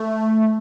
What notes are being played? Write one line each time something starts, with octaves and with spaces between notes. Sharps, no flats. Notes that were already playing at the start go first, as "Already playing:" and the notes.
Already playing: A3